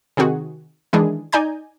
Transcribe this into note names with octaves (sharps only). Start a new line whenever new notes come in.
C3 D#3 C4 F#4 G#4
D#3 E3 G#3 D4 G#4
D#4 D5 G#5 A#5 G6